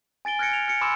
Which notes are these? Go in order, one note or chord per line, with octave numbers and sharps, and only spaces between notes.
G#5 A6 D7 G7
F6 F#6 G#6 A#6 C#7 D7
F7
F6 C#7
G#5 B5 C6 D6 E6 E7